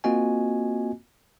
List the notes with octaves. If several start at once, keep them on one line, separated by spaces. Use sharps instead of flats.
A#3 C4 F4 F#4 D#5 G#5